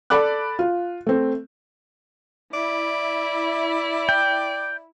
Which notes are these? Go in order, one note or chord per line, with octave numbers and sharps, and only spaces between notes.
A4 D5 B5 D6 F#6
F4
A3 C4
E4 D5
G5